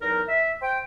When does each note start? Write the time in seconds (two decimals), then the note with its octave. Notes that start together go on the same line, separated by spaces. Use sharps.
0.01 E2 F#3 D#4 A#4
0.28 E5
0.62 C5 G5